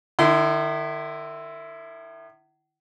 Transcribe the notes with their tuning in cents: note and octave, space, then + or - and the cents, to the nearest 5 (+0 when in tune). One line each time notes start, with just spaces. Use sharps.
D#3 -40 E4 +0 C6 -25